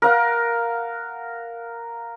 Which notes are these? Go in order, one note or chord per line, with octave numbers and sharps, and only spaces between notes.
A#4 F5 F#5